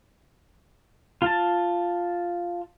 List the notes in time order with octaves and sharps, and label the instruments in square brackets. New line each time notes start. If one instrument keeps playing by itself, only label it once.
[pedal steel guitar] F4 A5